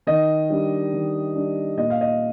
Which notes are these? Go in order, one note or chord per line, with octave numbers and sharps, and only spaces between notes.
D#3 D#5
G3 D4
D#3
G3 D4
A#2 D#5
F5
D#5